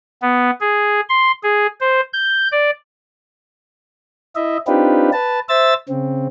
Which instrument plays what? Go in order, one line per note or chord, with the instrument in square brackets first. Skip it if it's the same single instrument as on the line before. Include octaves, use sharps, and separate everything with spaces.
[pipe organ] B3
G#4
C6
G#4
C5
G6
D5
E4 D#5 E5
C4 D4 D#4 F4 G4 B4
B4 A5
C5 E5 E6 A6
C#3 C4